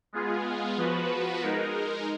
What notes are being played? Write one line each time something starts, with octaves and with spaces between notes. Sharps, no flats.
G#3 B3 F4 G#4
F3 B3 F#4 B4
G#3 D#4 A#4